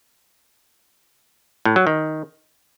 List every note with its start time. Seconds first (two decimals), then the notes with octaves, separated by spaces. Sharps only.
1.65 A2
1.76 F#3
1.87 D#3